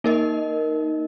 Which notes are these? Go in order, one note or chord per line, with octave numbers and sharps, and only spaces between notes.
A#3 D#4 A#4 D#5